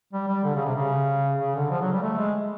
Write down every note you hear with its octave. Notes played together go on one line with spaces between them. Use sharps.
G3
G3
D3
C#3
C3
C#3
C#3
D3
F3
F#3
G3
A3
G#3